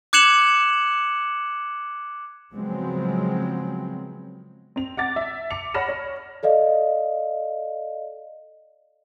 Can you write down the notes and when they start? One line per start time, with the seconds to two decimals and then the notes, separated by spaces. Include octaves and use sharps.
0.13 D6 F#6 G#6 C#7 E7 F#7
2.53 C#3 F3 F#3 G#3 B3 C4
4.76 C4 F7
4.97 F#5 D6 A6
5.16 E5
5.50 D6 C#7 F7
5.74 C#5 F#5 B5 F6 A#6 E7
5.89 C#5
6.43 A4 D5 D#5 F5